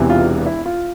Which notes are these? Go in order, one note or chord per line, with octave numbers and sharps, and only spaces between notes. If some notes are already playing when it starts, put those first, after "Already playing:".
Already playing: E1 E2 C3 E3
F4
E4
F4